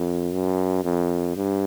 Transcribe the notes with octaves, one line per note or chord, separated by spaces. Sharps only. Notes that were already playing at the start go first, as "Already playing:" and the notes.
Already playing: F2
F#2
F2
G2